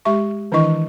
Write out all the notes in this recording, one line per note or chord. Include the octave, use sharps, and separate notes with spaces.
G#3 G4 E5 C#6
D#3 E3 D4 E4 D#5 C#6